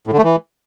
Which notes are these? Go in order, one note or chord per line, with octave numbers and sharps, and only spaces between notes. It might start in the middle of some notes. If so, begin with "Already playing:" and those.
A2
D3
A3
E3